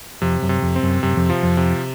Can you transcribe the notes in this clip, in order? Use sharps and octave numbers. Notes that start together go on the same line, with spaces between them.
F2 C3
F#2
C3
F2
C4
F#2
F#2 C3
F2
F3
F2
C3